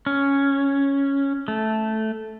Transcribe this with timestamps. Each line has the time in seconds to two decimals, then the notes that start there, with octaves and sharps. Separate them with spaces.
0.06 C#4
1.48 A3